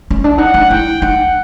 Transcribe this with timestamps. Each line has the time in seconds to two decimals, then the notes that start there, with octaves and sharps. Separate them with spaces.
0.10 C#4
0.24 D4
0.38 D#4 F#5
0.54 D#4
0.70 E4 G5
1.02 D#4 F#5